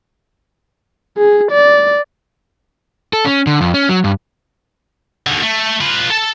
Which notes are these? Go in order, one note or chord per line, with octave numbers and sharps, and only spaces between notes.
G#4
D5
A4
C#4
D3
F2
C#4
F#3
G2
D#2 D3
A3
F4 B4
A4 A5